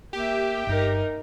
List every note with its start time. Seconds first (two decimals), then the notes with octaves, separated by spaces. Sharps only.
0.13 A#3 G4 E5
0.67 G1 G2 D#4 A#4